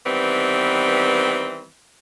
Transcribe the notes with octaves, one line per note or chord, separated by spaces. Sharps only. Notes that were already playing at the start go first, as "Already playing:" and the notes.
D#3 E3 G3 B3 C4